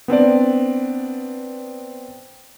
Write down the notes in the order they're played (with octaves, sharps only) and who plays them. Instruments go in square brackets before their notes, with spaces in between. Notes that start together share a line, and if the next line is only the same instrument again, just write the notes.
[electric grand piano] B3 C4 D4 D5